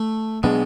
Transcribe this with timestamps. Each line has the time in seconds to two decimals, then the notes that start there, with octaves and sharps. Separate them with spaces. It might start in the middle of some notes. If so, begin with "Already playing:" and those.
Already playing: A3
0.43 B2 F#3 G#3 B3 D4